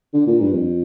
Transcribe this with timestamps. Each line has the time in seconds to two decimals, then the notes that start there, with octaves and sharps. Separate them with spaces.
0.14 D3
0.27 A#2
0.41 G2
0.53 F2